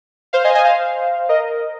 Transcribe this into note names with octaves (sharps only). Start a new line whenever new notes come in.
C5 F5
D#5 G#5
D#5 G#5
C5 F5
A#4 D#5